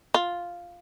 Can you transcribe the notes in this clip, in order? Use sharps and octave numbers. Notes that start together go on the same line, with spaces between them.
F4